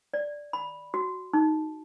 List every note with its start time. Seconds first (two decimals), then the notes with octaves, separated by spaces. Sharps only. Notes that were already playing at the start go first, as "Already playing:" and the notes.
0.14 D5
0.53 B5
0.94 F#4
1.33 D#4